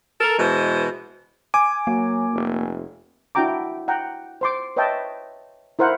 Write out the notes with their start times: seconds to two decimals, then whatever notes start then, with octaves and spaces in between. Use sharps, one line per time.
0.20 A4 A#4
0.38 B2 E3 G#3 C5
1.54 G#5 D6
1.87 F#3 A#3
2.33 F1
3.35 D4 E4 F#4 G5 A#5 D6
3.88 F#5 G5 A#5
4.41 C5 C6 D6
4.76 B4 C#5 D#5 E5 G5 A5
5.79 E4 A#4 C5 F5 F#5